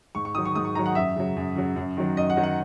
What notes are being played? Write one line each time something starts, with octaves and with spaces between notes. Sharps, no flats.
G#2 C#6
C#6
D#3 F#3 D#6
C#6
G#2 D#6
C#6
D#3 F#3 A#5
F#5
F#2 E5
C#3 F#3
F#2
C#3 F#3
F#2
D#3 F#3
F#2 D#5
F#5
D#3 F#3
F#5